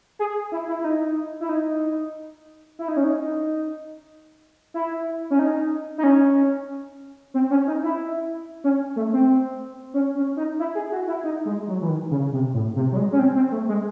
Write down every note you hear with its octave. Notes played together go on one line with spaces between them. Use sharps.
G#4
E4
E4
E4
D#4
E4
D#4
E4
D#4
C#4
D#4
E4
C#4
D#4
D#4
C#4
C4
C#4
D#4
E4
C#4
A3
C4
C#4
C#4
D#4
E4
G#4
F#4
E4
D#4
G#3
F#3
E3
D#3
C#3
C3
A2
C3
F#3
G#3
C#4
C4
C4
A3
G#3